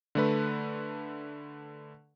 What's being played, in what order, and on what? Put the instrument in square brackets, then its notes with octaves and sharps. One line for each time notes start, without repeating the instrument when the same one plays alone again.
[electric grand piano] D3 A3 B4